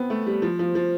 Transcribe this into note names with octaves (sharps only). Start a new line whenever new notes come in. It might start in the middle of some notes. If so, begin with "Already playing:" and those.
Already playing: B3 C4
A3
G3
F3
F3
F3